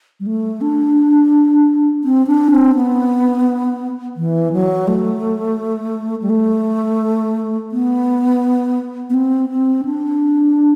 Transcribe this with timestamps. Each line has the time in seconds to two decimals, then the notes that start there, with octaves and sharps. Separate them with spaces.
0.20 G3
0.27 A3
0.61 D4
2.04 C4
2.27 D4
2.51 C4
2.75 B3
4.17 E3
4.53 F#3
4.88 A3
6.22 G3
6.30 A3
7.72 B3
9.10 B3
9.14 C4
9.50 C4
9.85 D4